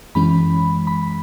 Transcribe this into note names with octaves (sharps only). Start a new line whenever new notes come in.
F#2 E3 G#3 C#4 B5
B5